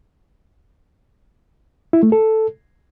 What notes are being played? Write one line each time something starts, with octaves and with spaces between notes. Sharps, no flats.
E4
A3
A4